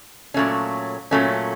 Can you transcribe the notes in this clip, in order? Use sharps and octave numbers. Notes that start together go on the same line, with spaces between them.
A#2 F#3 A3 C#4
A#2 F#3 A3 C#4